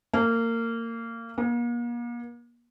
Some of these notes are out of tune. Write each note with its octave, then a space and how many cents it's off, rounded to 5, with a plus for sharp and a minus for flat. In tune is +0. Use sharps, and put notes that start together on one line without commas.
A#3 -25
A#3 +40